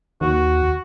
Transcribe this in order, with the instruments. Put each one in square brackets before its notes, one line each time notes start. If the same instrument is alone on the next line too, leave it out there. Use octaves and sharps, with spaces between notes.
[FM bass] D#2 [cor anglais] F#4